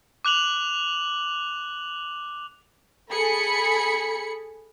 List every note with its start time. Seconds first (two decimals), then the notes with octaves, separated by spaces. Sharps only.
0.25 D6 F#6 F7 F#7
3.10 G#4 A4 B5 C#7